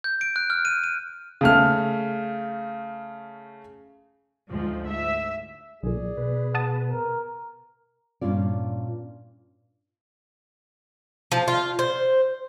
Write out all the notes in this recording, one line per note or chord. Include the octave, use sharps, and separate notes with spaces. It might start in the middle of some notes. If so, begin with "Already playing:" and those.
G6
D7
F#6
F6
D#7
D#7
C#3 A3 F6
D2 G#2 F3
E5
B1 A#2 G#4 D5
B2 B4
F#5 A5 D#6
A#4
G2 A#2 C#4 F4 D5
F3
F4
C5